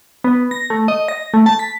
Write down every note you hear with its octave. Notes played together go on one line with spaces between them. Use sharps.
B3
A#6
A3
D#5
A#6
A3
A5
B6